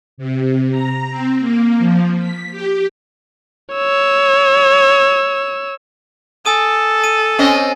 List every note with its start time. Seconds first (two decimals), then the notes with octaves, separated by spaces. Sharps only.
0.18 C3
0.70 A#5
1.10 C4
1.39 A#3
1.78 F3
2.18 B6
2.51 G4
3.74 C#5 E6
6.45 A4 G#5 D#6 D#7
7.04 D#7
7.39 C4 C#4 D#5